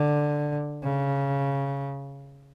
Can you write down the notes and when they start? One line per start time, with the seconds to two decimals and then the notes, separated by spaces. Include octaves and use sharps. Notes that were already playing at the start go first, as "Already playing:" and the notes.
Already playing: D3
0.84 C#3